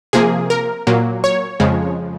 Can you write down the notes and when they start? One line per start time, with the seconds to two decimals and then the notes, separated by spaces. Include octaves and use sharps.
0.13 C3 F3 A#3 G#4
0.50 A#4
0.87 A#2 F#3 A#3
1.24 C#5
1.60 F2 C#3 F3 G#3